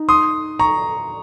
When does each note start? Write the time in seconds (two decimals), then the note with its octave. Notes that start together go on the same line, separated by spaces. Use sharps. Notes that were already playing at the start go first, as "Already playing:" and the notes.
Already playing: D#4
0.09 C6 D#6
0.59 A#5 C#6